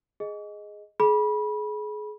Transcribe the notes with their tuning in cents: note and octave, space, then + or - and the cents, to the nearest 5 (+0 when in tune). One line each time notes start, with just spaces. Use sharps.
G#4 +0 D#5 +0
G#4 +30 B5 -25